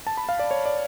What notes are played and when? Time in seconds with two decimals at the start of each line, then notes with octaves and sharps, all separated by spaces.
0.07 A5
0.17 B5
0.29 F5
0.39 D5
0.51 C#5
0.66 D5